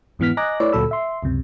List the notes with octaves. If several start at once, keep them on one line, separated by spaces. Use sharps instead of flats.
F2 G#2 E3 B3 F6 B6
D#5 G#5 A#5 D6 F#6 A#6
A3 E4 B4 C#5 D5 E5
D2 A#2 F#3 A4 B5 E6
E5 C6
C#2 F#2 C3